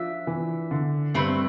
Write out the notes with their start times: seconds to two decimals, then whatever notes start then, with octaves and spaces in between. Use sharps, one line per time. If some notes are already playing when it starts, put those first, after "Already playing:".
Already playing: F3 D4 E5
0.27 E3
0.71 D3
1.14 G2 A3 C4 E4 B4